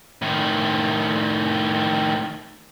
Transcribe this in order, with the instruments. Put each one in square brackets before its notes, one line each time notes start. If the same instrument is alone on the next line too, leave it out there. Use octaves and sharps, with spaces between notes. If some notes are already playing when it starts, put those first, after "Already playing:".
[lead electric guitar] A2 D#3